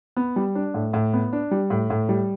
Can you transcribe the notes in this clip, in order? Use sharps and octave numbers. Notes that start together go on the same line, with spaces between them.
B3
G3
D4
A2
A2
B3
D4
G3
A2
A2
G3